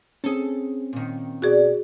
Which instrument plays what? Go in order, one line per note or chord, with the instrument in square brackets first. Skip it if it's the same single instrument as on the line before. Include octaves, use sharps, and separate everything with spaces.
[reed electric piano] C4 C#4 [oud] G#4 A4
[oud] A#2 D#3
[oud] B2 D5 [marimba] F#4 G#4